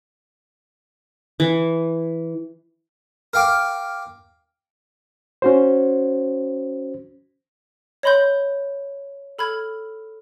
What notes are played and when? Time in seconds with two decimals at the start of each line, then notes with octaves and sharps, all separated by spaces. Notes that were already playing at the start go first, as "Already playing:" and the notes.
1.40 E3
3.33 A#4 F5 G5 D6
5.42 C#4 F#4 C5
8.03 C#5 D#5 B5 C6 G6
9.39 A4 B5 F6 G#6